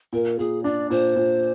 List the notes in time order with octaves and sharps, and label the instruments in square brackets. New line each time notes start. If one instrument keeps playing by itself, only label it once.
[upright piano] A#2 [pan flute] A#4
[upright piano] A#2 [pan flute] G#4
[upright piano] D4 [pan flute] D5
[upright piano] A#2 [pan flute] C5
[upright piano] A#2